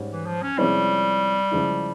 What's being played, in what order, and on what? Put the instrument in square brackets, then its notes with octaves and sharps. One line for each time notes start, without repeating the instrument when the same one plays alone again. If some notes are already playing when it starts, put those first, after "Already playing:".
Already playing: [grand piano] G#2 G3 C#4
[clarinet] E3
F3
C#4
[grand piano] C3 F3 G#3 C#4 E4 [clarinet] G3
[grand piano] C#3 F3 G#3 E4